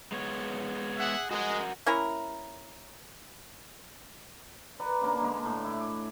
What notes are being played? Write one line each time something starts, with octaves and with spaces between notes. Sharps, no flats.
G#3 B3 C#5
G#4 E5 F#5
G#3 F#4 A#4 F#5
A#3 C#4 E4 A#4
B4 D5 F#5 A#5
C#3 A#3 D4
D3 G#3 A#3
A2
E4
D6